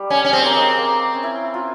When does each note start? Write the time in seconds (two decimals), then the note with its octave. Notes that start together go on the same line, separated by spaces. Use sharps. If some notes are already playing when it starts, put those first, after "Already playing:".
Already playing: G3
0.10 C#4
0.25 C#4
0.33 G#3 C4
0.45 A#3
0.56 G#3
0.78 A#3
1.14 C#4
1.23 E4
1.54 F4